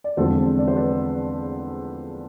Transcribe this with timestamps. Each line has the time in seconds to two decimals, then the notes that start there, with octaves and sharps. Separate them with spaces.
0.04 D5
0.17 E2 D3 F3 G#3 C4 A4 C5
0.58 D5
0.68 C5
0.76 B4 D5